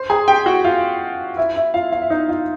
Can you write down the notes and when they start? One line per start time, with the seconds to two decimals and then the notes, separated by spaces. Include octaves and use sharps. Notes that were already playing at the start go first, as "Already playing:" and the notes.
Already playing: C5 C6
0.10 G#4 G#5
0.28 G4 G5
0.46 F#4 F#5
0.64 F4 F5
1.37 E4 E5
1.56 E4 E5
1.74 F4 F5
1.92 F4 F5
2.02 E5
2.10 D#4 D#5
2.29 F4 F5